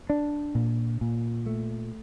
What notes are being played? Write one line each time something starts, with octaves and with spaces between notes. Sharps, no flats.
D4
A#2
A#2
A3